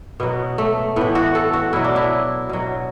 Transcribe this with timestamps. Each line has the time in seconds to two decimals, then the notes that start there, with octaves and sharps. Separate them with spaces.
0.20 B2 F#3 B3
0.58 A3
0.96 A2 E3 B3
1.15 F#4
1.35 A4
1.53 F#4
1.73 B2 F#3 E4
1.84 D4
1.96 E4
2.49 B2 F#3